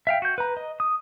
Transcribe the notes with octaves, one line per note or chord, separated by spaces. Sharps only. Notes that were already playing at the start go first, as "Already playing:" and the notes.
E5 F5 G5
F#4 G6
B4 A#5
D#5
D#6